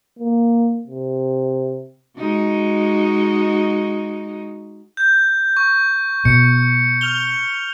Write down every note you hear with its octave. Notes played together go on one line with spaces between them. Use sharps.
A#3
C3
G#3 D#4 F#4
G6
C#6
B2 C#7
F6 F7 G7